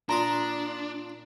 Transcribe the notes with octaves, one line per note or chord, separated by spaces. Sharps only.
A#2 D4 F4 A#5 D#6